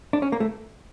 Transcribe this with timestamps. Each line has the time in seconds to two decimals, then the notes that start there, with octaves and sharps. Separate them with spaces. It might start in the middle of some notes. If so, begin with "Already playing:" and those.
0.13 D4
0.22 C#4
0.32 A#3
0.40 A3